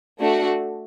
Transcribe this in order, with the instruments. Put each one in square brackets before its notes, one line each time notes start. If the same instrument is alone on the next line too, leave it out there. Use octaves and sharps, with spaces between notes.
[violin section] A3 D4 F#4 A4